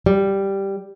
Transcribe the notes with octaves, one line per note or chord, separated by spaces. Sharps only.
G3